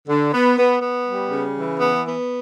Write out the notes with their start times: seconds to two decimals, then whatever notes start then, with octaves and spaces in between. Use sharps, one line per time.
0.08 D3
0.33 B3
0.58 B3
0.82 B3
1.07 G3
1.31 C#3
1.55 E3
1.80 B3
2.05 B3